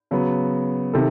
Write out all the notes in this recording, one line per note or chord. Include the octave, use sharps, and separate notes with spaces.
C#3 F#3 B3
C3 D#3 A4